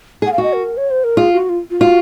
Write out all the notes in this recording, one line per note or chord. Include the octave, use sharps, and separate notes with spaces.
G#4
F#5
F5
F#4 D#5
A#4
C#5
C5
A#4
F4 G#4
F#4
F4
F4
F4 F#4